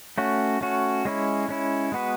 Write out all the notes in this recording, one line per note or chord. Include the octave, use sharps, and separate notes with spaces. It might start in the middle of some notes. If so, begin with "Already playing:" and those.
A3 C#4 F#4
A3 C#4 F#4
G#3 C#4 E4
G#3 C#4 E4
G#3 B3 F#4 B4